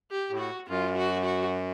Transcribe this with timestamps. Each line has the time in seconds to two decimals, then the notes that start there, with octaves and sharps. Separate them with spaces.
0.11 G4
0.30 A2
0.39 F#4
0.68 F#2 F4
0.97 F#4
1.25 F#4